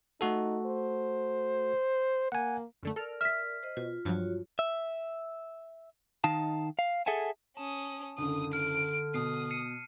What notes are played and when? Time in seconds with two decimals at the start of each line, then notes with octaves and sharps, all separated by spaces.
0.21 A3 D#4 F#4 A4
0.66 C5
2.32 A#3 F#5 G#5
2.83 F#2 D3 A3
2.96 A4 A#4 D5 F6
3.21 E5 F6 B6
3.63 C5 D#5
3.77 B2 F4
4.05 G2 F3 F#3 F4 F#4 C#5
4.59 E5
6.24 D#3 D#4 F5 A5
6.79 F5
7.06 G#4 A4 E5 F#5 G#5 A5
7.57 C#4 A5 D#6
8.18 F#1 D2 D3 D#6
8.53 F6 D7
9.14 B2 D#6 C7
9.51 C7 C#7 D#7